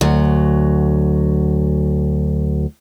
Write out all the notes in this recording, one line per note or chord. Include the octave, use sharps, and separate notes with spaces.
D2 F#3